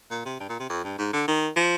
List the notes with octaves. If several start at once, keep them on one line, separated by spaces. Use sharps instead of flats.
A#2
C3
G2
A#2
C3
F2
G2
G#2
D3
D#3
F3